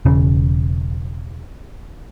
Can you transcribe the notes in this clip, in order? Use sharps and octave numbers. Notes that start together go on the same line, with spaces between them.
E1 C#3